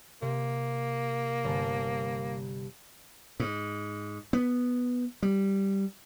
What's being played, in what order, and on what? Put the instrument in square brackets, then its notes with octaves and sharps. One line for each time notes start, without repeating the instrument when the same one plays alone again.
[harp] C3 [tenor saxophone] A#3
[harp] G1 G#5 A5
[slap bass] G#2
B3
G3